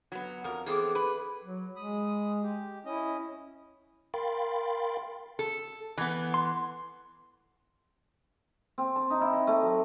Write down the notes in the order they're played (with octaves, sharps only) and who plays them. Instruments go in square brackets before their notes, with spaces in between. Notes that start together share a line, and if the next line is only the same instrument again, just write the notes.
[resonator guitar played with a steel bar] F#3 B3
F2 A#4
[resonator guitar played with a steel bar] E3 B3 C4 [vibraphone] G#4 A4 D6
[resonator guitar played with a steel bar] B4
[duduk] F#3
[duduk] G#3 [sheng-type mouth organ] B5 D#6
[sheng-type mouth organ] G4
[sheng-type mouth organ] C#4 D#5 [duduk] E4
[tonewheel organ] A#4 F5 G5 B5 C6 A6
[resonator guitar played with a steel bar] A4
E3 B3
[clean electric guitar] C6
[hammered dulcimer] C4
A5
D#4
E4
D#5
A3
F#3